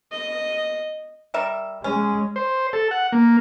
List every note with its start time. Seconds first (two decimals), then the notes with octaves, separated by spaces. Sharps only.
0.12 D#5
1.34 G3 A#4 E5
1.84 G#3 C#4
2.36 C5
2.73 A4
2.91 F#5
3.12 A#3